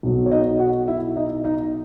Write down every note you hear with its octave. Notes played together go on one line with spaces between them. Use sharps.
B1 B2 F#3
C#5
D#4 D#5
F#4 F#5
E4 E5
D#4 D#5
D#4 D#5